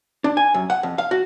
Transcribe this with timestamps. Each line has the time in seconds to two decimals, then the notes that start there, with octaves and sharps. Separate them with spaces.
0.24 D4
0.37 G#5
0.54 F#2
0.70 F#5
0.83 F2
0.98 F5
1.11 F#4